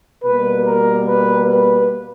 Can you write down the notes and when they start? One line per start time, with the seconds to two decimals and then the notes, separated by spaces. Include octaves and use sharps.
0.24 B2 G3 A#3 B4
0.65 A#4
1.06 B4
1.48 B4